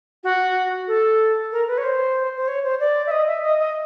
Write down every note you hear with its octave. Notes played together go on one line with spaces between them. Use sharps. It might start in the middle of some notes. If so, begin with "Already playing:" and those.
F#4
A4
A#4
B4
C#5
C5
C5
C#5
C5
D5
E5
D#5
E5
D#5
D#5